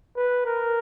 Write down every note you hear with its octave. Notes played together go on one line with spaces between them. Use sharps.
B4
A#4